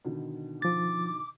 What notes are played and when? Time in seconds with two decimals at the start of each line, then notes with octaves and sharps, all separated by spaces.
0.05 B2 D3 D#3
0.62 F3 D6 A6